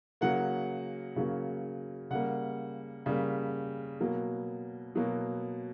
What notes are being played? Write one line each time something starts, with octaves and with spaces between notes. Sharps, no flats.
C#3 F#3 A#3 F#5
C#3 F#3 A#3
C#3 G3 A#3 F#5
C#3 G3 A#3
B2 F#3 A#3
B2 F#3 A#3